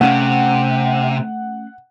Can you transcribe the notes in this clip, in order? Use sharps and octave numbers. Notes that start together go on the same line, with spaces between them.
C3 A3 C#4 F5 F#5